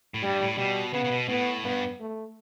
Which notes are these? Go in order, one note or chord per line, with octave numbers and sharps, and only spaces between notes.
A2
G2 G3
A2
B2 G3
C#3 B3
C#3
B2
A2 B3
G2 B3
A3